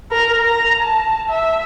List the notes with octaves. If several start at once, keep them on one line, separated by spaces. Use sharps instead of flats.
A#4
A#5
A5
E5